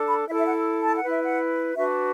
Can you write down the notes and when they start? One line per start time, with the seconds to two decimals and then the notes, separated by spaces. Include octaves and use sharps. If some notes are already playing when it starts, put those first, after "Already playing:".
Already playing: D4 A4
0.09 B5
0.27 E4 A4 E5
0.39 E5
0.47 F#5
0.83 A5
0.96 F#5
1.01 E4 B4
1.10 E5
1.23 F#5
1.76 D4 F#4 B4 E5